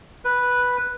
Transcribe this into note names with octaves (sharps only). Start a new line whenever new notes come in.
B4